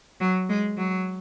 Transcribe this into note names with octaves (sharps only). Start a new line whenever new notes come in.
F#3
G#3
F#3